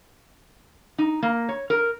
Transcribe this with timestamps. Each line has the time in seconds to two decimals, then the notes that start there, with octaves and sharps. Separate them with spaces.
0.98 D#4
1.23 A#3
1.49 C#5
1.70 A#4